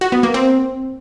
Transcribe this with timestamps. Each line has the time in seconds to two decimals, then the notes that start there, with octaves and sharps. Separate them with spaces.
0.01 F#4
0.12 B3
0.23 A#3
0.34 C4